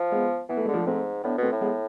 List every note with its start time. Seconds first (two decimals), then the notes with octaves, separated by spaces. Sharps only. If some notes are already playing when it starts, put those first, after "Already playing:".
Already playing: F3
0.12 G#3 B3
0.49 E3 B3
0.57 A3
0.65 D3 G#3
0.73 F3 A3
0.86 G#2 A3 C4
1.24 A2 B3 D4
1.38 B2 A3 C4
1.52 A2
1.61 G#3 B3